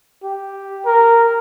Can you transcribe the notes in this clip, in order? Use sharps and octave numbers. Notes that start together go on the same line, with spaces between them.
G4
A#4